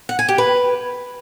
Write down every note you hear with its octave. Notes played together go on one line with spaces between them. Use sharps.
F#5
G#5
G4
B4